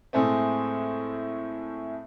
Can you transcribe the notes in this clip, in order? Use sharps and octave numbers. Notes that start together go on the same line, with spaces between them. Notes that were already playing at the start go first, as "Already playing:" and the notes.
A2 G#3 A3 C4